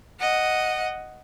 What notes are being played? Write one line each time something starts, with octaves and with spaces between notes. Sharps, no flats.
D#5 F#5